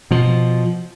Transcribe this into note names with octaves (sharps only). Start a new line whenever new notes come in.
B2 F3